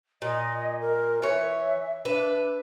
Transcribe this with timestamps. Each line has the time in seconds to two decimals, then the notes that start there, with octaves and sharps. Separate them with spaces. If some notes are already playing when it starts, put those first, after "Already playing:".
0.22 A#2 D#5
0.81 A#4
1.22 E3 C#5 E5
2.05 D4 B4 E5